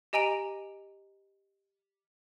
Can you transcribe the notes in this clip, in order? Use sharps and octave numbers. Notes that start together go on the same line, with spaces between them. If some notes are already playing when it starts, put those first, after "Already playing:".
G4 D#5 G#5 A#5 D7 F7